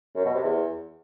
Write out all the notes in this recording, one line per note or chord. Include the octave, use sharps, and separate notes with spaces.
F#2
B2
C3
E2